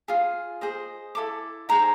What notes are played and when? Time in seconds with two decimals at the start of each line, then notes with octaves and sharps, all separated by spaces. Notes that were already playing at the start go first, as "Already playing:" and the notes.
0.08 F4 G#4
0.61 G#4 C5 D#5
1.15 E4 A4 D6
1.69 D#4 G#4 C5 A#5